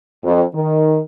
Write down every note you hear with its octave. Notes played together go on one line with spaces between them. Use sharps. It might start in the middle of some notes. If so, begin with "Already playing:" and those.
F2
D#3